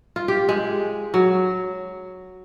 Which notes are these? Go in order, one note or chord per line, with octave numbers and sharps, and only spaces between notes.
F4
G4
G#3
F#3